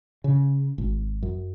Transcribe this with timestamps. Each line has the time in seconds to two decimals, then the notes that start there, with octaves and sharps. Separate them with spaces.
0.24 C#3
0.78 G#1
1.23 F#2